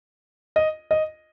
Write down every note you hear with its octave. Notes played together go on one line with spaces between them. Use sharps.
D#5
D#5